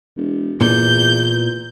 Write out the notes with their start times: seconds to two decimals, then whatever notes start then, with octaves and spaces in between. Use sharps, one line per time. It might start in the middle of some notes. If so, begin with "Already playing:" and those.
0.17 E1
0.61 E2 A#2 G6